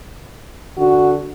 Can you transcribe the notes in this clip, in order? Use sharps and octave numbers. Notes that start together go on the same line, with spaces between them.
D3 F#4